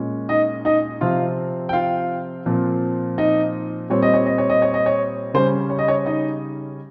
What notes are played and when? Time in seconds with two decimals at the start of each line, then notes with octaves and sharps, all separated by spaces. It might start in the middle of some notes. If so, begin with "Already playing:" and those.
Already playing: A#2 G#3 C#4
0.29 D#4 D#5
0.65 D#4 D#5
1.01 C3 F3 C4 F4 F5
1.69 G5
1.73 F4 F5
2.46 A#2 F3 C4
3.18 D#4 D#5
3.90 A#2 G3 C4 C#5
4.02 D#5
4.14 C#5
4.26 D#5
4.38 C#5
4.50 D#5
4.62 C#5
4.74 D#5
4.86 C#5
5.34 C#3 G3 C#4 C5
5.70 C#5
5.79 D#5
5.88 C#5
6.06 D#4 D#5